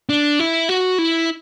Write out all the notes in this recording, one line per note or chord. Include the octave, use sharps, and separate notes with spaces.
D4
E4
F#4
E4